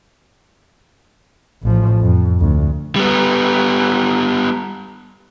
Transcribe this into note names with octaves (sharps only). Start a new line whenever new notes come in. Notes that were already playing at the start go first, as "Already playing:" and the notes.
A1 F3
F2
D2
G3 B3